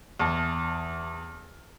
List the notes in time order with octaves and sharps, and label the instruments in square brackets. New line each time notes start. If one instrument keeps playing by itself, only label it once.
[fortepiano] E2 A5